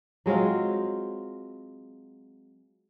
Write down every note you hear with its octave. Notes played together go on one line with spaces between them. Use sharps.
F#3 G#3 C4 F4